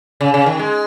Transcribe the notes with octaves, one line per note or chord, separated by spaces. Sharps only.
C#3
C#3
D#3
G#3